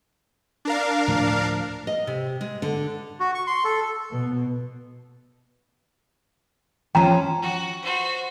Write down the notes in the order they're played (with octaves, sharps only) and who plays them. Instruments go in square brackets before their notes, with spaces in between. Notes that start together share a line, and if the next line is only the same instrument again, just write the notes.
[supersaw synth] D4 A#4 F5
[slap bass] D2 A2 F3
[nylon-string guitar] D#5
C3
G#3
D3
[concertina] F#4
C#6
C6
A4
[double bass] B2
[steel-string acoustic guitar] F3 C#4 [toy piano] G5 A#5
[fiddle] F#4
F#4 C5